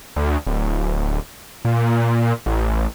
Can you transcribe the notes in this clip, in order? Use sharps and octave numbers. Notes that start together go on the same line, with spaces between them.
D2
D1
A#2
A1